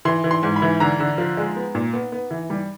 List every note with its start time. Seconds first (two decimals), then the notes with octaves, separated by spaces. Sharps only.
0.05 E3 C6
0.24 E3
0.31 C6
0.43 G#2
0.56 B5
0.62 E3
0.80 D3 A#5
1.00 D3
1.18 F3
1.37 G#3
1.56 B3
1.75 A#2
1.93 B3
2.12 B3
2.31 E3
2.50 G3